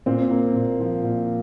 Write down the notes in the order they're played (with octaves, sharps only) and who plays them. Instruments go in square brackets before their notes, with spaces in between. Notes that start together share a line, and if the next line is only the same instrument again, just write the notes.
[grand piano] A#2 [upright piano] C4
[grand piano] A#3
A#2
F3
A#2